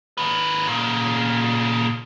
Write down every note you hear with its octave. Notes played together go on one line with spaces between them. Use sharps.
D#3 B4
A#2 C#3